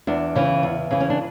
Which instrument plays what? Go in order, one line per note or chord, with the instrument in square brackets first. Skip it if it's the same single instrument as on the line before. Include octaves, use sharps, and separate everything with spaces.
[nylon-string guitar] E2 D4
C#3 E3
E2
C#3 E3
C#4
D4